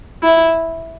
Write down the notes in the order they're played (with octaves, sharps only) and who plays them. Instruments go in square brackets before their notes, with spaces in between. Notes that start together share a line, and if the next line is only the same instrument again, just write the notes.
[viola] E4